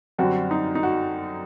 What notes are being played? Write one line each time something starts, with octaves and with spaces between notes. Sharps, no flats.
F#2 D3 G3 C4 F#4
D#4
D#4
F#4